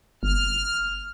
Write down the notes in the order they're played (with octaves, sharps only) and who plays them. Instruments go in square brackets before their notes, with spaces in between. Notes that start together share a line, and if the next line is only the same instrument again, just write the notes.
[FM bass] G1 [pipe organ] F6